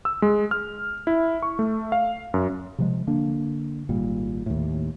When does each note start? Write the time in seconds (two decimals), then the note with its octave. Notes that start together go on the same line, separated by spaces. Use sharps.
0.05 E6
0.22 G#3
0.51 F6
1.07 E4
1.42 C#6
1.59 A3
1.92 F5
2.34 F#2
2.78 C3 F3 G#3
3.07 D3 A#3 D4
3.89 G#1 A#2 G3
4.46 D#2 A2